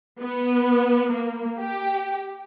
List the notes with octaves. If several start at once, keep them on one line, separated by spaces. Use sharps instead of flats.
B3
A#3
G4